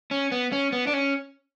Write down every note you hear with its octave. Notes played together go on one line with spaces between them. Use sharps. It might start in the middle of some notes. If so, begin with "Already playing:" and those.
C#4
B3
C#4
B3
D4
C#4